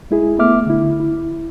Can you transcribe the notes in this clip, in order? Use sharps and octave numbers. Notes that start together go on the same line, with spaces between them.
G#3 E4 G#4
A3 B3 E5 D6 F6
D3 E4
E4